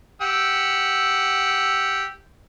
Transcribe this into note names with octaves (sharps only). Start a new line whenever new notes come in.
G4 F#5 E6